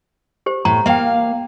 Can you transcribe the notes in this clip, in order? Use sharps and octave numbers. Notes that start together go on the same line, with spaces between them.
G4 C5
A2 A#5
A#3 E5 F5 G5